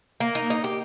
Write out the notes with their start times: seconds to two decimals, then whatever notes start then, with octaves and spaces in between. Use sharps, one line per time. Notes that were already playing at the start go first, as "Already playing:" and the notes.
0.20 A#3
0.35 D#4
0.50 D#4
0.64 G4